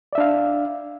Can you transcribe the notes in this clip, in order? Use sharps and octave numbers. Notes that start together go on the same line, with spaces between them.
D4 D5 E5 F5